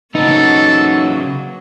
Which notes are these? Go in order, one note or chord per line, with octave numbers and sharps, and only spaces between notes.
C#3 F#3 A#3 B3 D#4 A4